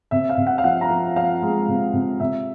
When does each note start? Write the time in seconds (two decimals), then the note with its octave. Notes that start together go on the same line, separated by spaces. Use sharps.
0.11 C3 E5
0.29 F5
0.38 C3
0.47 F#5
0.58 F5
0.64 F3 F#5
0.81 A#5
0.90 F3
1.16 F3 F5
1.42 G#3
1.69 C3
1.94 C3
2.20 C3 E5